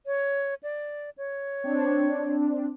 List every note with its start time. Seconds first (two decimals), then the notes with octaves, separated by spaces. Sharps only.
0.06 C#5
0.63 D5
1.18 C#5
1.64 C4 D4